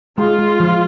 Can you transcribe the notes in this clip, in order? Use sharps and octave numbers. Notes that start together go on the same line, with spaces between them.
G#3 F4
G#3
F3